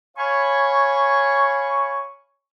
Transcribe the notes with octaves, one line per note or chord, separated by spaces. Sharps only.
C#5 F5 G#5 B5 C#6